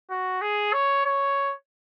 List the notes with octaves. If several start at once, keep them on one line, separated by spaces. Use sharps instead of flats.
F#4
G#4
C#5
C#5